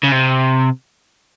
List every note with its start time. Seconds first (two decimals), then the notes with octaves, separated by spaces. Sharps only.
0.04 C#3
0.12 C3